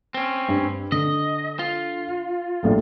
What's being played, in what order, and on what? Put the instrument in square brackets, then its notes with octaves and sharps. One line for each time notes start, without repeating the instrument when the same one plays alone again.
[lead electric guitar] C4 C#4
[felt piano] G2
[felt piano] D3 [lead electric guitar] D#5
[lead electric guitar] F4
[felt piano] A#1 A2 G3